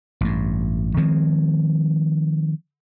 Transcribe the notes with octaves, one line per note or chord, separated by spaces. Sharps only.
A1 G2
D#3 F3 G#3 C4